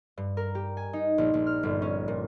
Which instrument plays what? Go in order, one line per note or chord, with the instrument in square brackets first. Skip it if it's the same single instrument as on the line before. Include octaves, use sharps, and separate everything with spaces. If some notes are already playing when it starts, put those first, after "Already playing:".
[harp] G2
A#4
G4
G#5
D#4
A#1
A#1
F6
G1
C#4
A#2